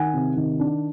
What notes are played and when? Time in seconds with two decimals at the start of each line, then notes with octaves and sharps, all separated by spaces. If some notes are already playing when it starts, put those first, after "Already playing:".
Already playing: D#3 F#5 G#5
0.14 C3
0.36 D#3
0.60 D4